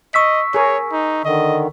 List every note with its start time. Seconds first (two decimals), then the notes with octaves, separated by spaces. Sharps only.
0.14 D#5 C#6 E6 B6
0.54 G#4 A#4 C#5
0.92 D#4
1.25 D3 D#3 D#5